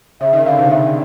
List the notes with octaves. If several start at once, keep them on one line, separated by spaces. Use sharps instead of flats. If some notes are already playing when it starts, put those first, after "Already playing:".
C#3 E5
D#3
D3 F5
C3
C#3 E5